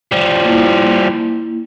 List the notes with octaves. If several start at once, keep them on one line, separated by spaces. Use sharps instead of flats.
F3 G3
A#3 E4